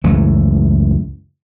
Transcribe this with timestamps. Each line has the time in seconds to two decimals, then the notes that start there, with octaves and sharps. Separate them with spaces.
0.04 C#2 F#2 E3 A3